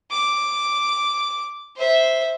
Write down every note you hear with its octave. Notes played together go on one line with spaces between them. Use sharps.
D6
C5 E5